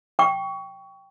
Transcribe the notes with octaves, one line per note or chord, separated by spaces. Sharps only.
G5 C#6